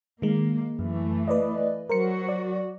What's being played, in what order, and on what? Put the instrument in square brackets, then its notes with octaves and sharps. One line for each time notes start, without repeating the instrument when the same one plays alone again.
[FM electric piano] D#3 G#3 [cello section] A#3
[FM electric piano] F#2 [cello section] E3 A3
[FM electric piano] B4 D5 D#5
[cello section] F#3 F#4 [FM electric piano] A#4 C5 C#7
[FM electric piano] D5